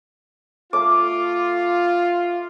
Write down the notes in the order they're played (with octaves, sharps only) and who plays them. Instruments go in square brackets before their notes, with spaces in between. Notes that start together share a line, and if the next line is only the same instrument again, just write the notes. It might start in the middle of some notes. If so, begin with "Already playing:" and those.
[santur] A3 D6 [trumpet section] F4